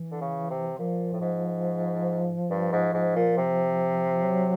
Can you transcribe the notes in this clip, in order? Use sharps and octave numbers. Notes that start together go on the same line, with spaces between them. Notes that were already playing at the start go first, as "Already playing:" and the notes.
Already playing: E3
D3
C#3
C3
A#2 F3
A2
G#2
G2
G#2
G#2
A#2
C3
F#3